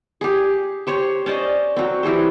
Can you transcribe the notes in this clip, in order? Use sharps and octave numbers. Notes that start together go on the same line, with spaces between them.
G4 G#4
G4 C5 C#5
C#4 C5 D5 D#5
F#3 C4
E3 G4 G#4 C5